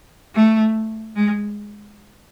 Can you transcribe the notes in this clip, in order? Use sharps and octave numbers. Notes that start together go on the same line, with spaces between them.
A3
G#3